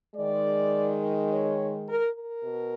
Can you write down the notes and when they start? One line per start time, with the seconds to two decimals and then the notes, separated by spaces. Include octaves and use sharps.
0.15 D#3 G#3 D5
1.30 C#5
1.88 A#4
2.16 A#4
2.44 B2